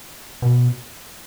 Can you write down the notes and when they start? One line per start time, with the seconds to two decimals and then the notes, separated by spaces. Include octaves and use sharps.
0.42 B2